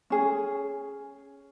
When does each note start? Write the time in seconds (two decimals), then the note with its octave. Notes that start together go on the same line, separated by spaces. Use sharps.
0.10 C#4 G#4